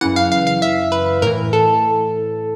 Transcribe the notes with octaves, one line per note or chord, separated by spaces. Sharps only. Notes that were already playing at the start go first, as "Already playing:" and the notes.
F#2 C#3 E3 F#5
F5
F5
F5
E5
B4
A2 E3 A#4
A4